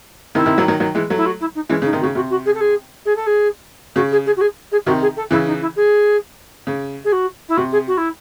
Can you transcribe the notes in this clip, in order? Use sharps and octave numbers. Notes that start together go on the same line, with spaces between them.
C3 D#3 E4
C3 D#3
D#3 F#3
D#3 F#3
D#3 F#3
E3 G#3
F#3 A3
E4
F#4
E4
D#4
E3 G#3 C#4
C#3
D#4
C3 D#3
F#4
C#3
C3 F#4
F#4
G#4
A4
G#4
G#4
A4
G#4
C#3 F#4
G#4
G#4
F#4
G#4
G#4
C3 D#3 F#4
G#4
A4
C#3 E3 E4
D#4
E4
G#4
C#3
G#4
F#4
E4
C3 F#4
G#4
F#4
E4